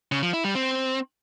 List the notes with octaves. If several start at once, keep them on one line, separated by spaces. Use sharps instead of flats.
C#3
F3
E4
G3
C4